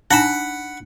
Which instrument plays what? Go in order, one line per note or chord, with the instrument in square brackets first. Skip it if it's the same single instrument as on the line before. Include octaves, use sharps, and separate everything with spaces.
[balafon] D4 D#4 G#5 [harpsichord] F#5 B5